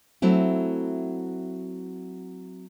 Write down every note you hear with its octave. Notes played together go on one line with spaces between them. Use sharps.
F#3 A3 C4 E4